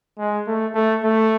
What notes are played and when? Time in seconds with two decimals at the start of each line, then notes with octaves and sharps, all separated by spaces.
0.19 G#3
0.47 A3
0.75 A3
1.04 A3